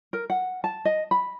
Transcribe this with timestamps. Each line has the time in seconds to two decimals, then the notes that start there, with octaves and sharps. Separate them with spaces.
0.13 A#4
0.30 F#5
0.64 A5
0.85 D#5
1.11 B5